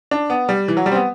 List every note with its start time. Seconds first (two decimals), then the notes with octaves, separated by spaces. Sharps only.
0.11 D4
0.30 B3
0.49 G3
0.68 E3
0.77 F#3
0.86 G3
0.92 C4
0.95 B3